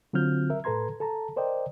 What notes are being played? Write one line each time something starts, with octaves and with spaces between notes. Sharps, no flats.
D3 F#3 C4 F4 F6 G6
A#4 E5
A2 A4 B4 A#5 C6 G#6
A4 A5 A#5
A#4 C5 D5 D#5 G5